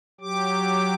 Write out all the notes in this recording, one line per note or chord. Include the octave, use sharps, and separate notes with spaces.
F#3 G4 D6